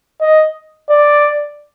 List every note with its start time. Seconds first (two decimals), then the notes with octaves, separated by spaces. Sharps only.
0.21 D#5
0.90 D5